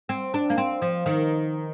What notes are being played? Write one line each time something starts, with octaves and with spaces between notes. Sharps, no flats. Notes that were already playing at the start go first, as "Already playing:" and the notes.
C4
D4
A#3
C4
F3
D#3